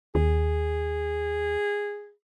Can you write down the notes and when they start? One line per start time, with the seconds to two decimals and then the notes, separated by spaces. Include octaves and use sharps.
0.15 D#2 G#4